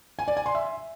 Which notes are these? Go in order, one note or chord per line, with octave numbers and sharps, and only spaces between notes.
G#5
D5
G#5
C6
E5